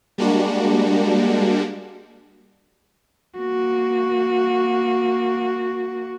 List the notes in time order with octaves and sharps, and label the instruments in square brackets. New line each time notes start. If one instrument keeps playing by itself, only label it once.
[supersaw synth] G3 G#3 A#3 D4 F#4
[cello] A#3 F#4